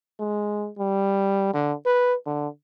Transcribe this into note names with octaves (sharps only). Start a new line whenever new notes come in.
G#3
G3
D3
B4
D3